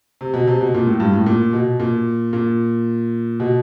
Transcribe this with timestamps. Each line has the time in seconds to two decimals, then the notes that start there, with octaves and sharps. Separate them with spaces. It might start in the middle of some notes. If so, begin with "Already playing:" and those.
0.21 C3
0.34 B2
0.47 C3
0.61 B2
0.74 A#2
0.87 A2
1.00 G2
1.13 A2
1.26 A#2
1.53 B2
1.80 A#2
2.33 A#2
3.40 B2